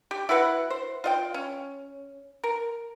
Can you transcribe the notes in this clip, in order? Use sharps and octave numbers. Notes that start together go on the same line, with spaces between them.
G4
E4 F#4 B4 F#5
C5
F4 D#5 G5
C#4
A#4